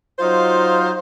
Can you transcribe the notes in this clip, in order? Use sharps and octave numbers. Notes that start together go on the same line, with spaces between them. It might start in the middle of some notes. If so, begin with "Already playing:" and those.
F#3 D#4 F4 C5 F5